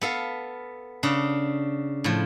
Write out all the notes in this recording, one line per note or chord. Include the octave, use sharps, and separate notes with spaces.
B3 A4 F5
C#3 D4
A2 F3